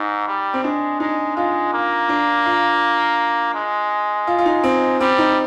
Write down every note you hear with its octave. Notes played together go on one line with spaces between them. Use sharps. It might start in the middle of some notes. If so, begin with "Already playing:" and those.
Already playing: G#2 D#4
G3
C4
G#3 D4
G#3 D#4
G#3 F4
A#3
D4
F4
G#3
F4
F4
D#4
C4
G3 C4
D#4